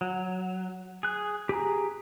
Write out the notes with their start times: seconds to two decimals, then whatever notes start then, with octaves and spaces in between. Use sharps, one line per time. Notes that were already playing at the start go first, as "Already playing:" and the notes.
0.01 F#3
1.03 G#4 F#6
1.49 G4 G#4 G#5 A#5